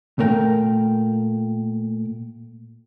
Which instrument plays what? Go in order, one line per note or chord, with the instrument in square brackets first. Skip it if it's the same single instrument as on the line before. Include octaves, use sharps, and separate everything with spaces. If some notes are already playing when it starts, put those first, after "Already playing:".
[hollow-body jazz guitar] A#2 A3 A#4 G5